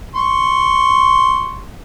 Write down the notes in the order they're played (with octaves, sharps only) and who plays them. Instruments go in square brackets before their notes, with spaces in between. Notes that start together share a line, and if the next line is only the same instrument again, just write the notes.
[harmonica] C6 C#6